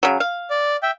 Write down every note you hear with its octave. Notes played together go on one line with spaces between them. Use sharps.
C#3 F#3
F5
D5
E5 G5